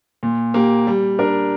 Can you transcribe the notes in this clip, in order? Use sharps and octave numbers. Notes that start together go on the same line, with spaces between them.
A#2
A#3 G4
G3
D4 A#4